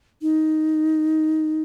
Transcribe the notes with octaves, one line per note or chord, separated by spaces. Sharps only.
D#4